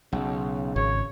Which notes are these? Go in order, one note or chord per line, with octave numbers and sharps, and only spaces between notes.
B1 C#3
G#1 C#5